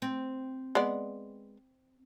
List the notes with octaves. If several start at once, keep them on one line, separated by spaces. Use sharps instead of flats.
C4
G#3 B3 D5